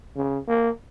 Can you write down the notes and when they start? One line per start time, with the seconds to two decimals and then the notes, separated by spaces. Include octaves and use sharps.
0.16 C#3
0.48 A#3